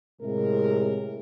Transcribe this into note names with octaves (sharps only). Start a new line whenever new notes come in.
A2 C3 G#3 A#4